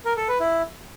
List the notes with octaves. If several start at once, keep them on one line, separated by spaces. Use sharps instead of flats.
A#4
A4
B4
E4